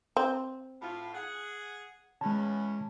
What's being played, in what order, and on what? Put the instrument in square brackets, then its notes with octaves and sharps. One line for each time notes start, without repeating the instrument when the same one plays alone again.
[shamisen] C4
[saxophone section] A2 F4
G#4 F#5
[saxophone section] E2 C#4 [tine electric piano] G#3 A5